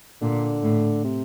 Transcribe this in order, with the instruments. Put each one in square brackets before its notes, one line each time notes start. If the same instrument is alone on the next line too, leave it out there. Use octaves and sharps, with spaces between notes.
[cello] A#2 [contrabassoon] D3
[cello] A2
[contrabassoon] C3